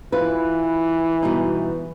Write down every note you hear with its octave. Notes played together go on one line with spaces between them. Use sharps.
E3 F4 B4
B2 G3 D#4